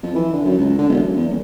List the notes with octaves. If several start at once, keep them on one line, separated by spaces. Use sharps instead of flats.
F2
E3
D3
F#2
C#2
D3
E1
F#2
E2
D#1